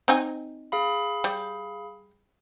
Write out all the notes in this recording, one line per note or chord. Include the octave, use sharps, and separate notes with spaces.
C4 D#4 G#5
G#4 F5 B5
G3